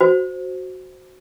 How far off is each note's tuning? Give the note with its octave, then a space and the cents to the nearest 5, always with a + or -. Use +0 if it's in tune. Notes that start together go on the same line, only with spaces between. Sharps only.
F#4 +0 C5 +0